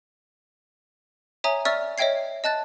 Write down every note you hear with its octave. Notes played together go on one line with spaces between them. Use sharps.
C#5 E5 G#5 A#5 D#6
D5 E5 C#6 E6 F6 A6
C#5 D#5 E5 G5 G#6 C7
D#5 A5 F#6 A6